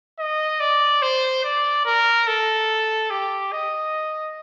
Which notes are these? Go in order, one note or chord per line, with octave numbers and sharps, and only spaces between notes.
D#5
D5
C5
D5
A#4
A4
G4
D#5